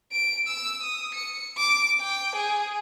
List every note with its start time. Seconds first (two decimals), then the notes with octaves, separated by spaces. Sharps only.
0.12 D7
0.48 E6
0.83 D#6
1.14 C#7
1.57 D6
2.00 G5
2.36 G#4